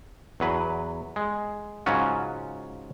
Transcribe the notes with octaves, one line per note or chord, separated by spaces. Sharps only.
E2 F#3 B4
G#3
G#2 C#3 F#3 C#4 F4 F#4